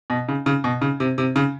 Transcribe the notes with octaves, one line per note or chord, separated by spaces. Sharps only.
B2
C#3
C#3
B2
C#3
C3
C3
C#3